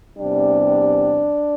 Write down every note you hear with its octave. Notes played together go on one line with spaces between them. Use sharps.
E2 C3 G3 D4